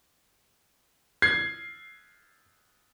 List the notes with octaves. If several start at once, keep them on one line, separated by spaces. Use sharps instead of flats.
G#6 C7